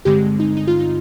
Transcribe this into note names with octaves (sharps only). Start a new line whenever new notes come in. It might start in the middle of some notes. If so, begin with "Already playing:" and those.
G2 D3 G#3 C4 G4
D#4
D#4
F4
D#4